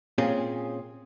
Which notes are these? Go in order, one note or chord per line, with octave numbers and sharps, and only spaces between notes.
A#2 C4 C#4 F4 G#4